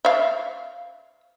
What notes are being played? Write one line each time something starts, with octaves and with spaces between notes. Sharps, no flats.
E5 F5